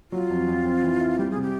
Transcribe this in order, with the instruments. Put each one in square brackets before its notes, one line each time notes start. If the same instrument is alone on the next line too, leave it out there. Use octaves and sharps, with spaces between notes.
[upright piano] F#3 [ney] F4
[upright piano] F2
F2
C4
E3
E4
[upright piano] G3 [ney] G4
[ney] G#4
[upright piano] C3
[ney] G4